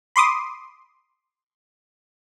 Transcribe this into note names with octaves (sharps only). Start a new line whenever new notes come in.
B5 C6 D6 D#6